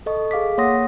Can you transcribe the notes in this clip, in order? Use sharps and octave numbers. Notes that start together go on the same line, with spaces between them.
A4 D#5 C#6
G#4 F5 D6 B6
A#3 C#5 F#5 C6 D#6 A#6